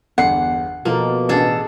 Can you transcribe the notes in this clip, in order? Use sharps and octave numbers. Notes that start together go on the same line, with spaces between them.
G1 E2 F#5 C7
B2 F3 A#3 A4
A1 D4 G#4 A4